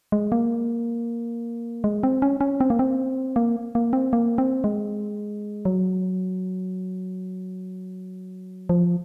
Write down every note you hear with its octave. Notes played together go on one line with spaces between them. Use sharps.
G#3
A#3
G#3
C4
C#4
C#4
C4
A#3
C4
A#3
A#3
C4
A#3
C4
G#3
F#3
F3